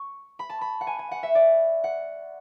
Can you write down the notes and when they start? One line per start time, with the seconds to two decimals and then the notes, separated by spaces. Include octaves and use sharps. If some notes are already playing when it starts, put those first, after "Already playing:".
Already playing: C#6
0.39 B5
0.50 A5
0.61 B5
0.81 F#5
0.87 G#5
0.99 G#5
1.11 F#5
1.23 E5
1.35 D5
1.84 F#5